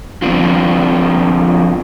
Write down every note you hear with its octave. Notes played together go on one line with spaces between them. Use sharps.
F3 B3 C4 D4 F4